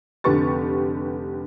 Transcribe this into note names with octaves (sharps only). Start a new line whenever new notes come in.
F1 D3 G4 B4 C#6 A6